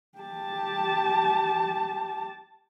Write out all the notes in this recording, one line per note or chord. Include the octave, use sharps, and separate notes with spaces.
G4 A5